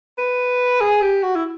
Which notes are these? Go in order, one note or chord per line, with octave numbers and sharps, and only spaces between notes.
B4
G#4
G4
F#4
E4